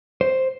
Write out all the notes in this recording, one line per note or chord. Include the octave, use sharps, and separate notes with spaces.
C5